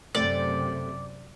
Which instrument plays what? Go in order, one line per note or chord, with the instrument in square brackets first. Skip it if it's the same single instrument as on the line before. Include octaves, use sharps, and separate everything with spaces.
[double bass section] F#2 C3 [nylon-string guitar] A3 C4 C5 [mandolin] D5